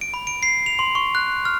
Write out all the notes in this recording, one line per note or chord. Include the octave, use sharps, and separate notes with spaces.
D7
B5
D7
C7
F7
C6
C#6
F#6
F6